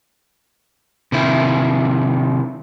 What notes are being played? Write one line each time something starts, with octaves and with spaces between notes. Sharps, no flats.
C3 D#3 E4